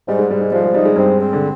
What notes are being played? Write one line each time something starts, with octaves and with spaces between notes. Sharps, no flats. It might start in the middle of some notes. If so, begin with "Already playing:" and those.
G#2 G3
G#3
G#2 G3
G#3
F3 G3
G#3
G3 D#4
G#3
G2 G3 C4
C4
D3